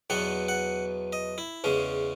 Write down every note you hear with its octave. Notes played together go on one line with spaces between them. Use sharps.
E2 B2 F#3 B3 F#5
F#5
D#5
E4
E2 C#3 G#3 C#4